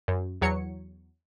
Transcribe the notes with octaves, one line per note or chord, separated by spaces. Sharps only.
F#2
E2 F#3 C#5 C#7